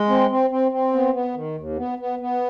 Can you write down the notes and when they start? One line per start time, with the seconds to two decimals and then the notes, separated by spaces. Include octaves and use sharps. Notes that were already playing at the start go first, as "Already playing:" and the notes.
Already playing: G#3
0.09 C4
0.30 C4
0.50 C4
0.71 C4
0.93 B3
1.14 B3
1.35 D#3
1.56 D#2
1.77 B3
1.98 B3
2.19 B3